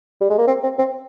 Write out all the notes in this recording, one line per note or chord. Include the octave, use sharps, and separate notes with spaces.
G3
G#3
A#3
C4
C4
C4